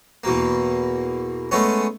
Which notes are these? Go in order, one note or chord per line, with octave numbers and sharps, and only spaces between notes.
E2 B2 A#3
G#3 A3 B3 C#4